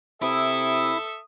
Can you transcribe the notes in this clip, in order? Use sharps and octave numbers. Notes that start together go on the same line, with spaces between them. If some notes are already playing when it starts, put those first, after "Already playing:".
C3 E4 A4 E5 D#6